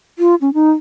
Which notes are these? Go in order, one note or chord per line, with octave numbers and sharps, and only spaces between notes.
F4
C#4
D#4